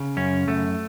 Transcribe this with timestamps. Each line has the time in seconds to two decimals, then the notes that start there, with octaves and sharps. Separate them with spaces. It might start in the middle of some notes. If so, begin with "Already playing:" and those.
Already playing: C#3
0.17 F#2 C#4
0.47 F#2 A3